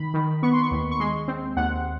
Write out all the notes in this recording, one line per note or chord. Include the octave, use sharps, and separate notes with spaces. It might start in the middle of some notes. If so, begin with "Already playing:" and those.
Already playing: D#3 B5
D#3
B3 C#6
C6
C#6
D#2
C#6
G#3 C6
C4
D#2 F#5